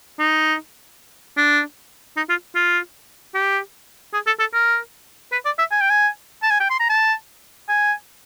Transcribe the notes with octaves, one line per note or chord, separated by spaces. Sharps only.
D#4
D4
D#4
F4
F4
G4
G#4
A4
A4
A#4
B4
D5
E5
G#5
G5
G#5
A5
G#5
G5
C6
A#5
A5
G#5